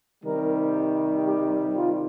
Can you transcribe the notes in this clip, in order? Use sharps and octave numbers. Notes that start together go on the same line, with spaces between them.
C3 D#3 G3 A#4
G4
F4